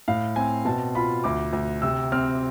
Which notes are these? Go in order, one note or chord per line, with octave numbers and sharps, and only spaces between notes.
A2 F5
C4 G#5
B2 A5
F4 B5
D2 D6
D2
C3 E6
C4 F6